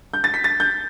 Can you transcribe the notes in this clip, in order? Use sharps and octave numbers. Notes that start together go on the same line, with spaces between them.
G6
A6
B6
A6
G6